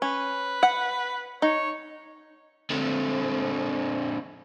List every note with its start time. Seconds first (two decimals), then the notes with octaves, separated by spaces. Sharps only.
0.02 C#4 B4
0.63 F#5
1.42 D#4 C#5
2.71 D3 C4